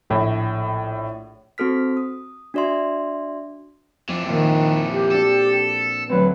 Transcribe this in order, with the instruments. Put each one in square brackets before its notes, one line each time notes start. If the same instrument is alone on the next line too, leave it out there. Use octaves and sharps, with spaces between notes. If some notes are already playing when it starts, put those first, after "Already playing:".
[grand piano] A#1 A2
[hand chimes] C4 F#4 A4 F6 B6
D#6
D4 F#4 D5 E5 C6
[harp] F2 [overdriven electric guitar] E3 D4
[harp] F2 A#2 [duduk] D#3
[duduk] G4
[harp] D4 F#4 [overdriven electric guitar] A4
[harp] D2 F#3 C4 [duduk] B4